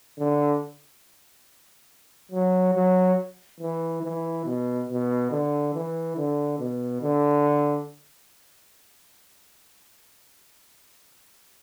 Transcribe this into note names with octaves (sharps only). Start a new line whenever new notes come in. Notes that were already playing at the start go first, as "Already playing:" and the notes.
D3
F#3
F#3
E3
E3
B2
B2
D3
E3
D3
B2
D3